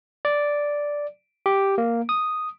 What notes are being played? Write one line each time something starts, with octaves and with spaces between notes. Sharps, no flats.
D5
G4
A#3
D#6